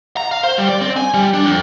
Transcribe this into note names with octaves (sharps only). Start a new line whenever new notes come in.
A#5
F5
C5
G3
D5
C4
G#5
G3
D4
F2